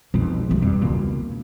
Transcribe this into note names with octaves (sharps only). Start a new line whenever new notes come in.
B1 F2 B2
E2 G3
E2 G2
C#2 B2 A#3 C#4 E4